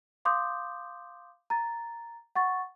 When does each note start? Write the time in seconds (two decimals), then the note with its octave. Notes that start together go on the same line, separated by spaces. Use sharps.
0.25 F5 C6 D6 D#6 G6
1.50 A#5 A6
2.35 F#5 C#6 A6